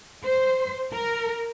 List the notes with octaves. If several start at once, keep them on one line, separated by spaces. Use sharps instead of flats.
C5
A#4